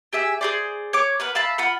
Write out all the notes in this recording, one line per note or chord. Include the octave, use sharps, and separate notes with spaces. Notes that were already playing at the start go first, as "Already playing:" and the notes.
G4 G#4 E5 G#5
G#4 C5 D5
C#5 D6
A#4 B4 F#5
E5 F5 A5 B5
F4 F#5 B5